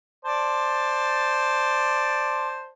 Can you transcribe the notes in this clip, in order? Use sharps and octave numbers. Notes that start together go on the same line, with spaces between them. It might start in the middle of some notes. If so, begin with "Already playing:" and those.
C5 D5 A5